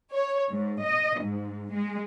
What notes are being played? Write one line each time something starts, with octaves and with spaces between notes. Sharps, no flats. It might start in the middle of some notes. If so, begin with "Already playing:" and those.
C#5
G#2
D#5
G#2
G#3